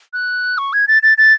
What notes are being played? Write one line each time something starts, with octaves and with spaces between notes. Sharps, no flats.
F#6
C#6
G#6
A6
A6
A6